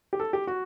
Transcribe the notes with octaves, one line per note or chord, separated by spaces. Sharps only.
G4
A4
G4
F#4